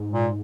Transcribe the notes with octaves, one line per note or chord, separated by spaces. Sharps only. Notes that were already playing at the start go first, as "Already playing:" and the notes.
Already playing: G#2
A#2